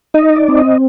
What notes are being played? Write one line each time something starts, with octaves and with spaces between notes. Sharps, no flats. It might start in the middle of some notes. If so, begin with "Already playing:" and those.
D#4 D#5
D5
C4
D#5